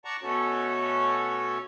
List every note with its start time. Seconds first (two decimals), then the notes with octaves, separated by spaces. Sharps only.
0.05 D5 F#5 A5 A#5 C#6
0.23 B2 A3 C#4 F#4 A4 C#5